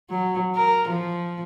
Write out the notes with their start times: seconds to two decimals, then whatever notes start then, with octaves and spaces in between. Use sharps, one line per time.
0.10 F#3
0.56 A#4
0.89 F3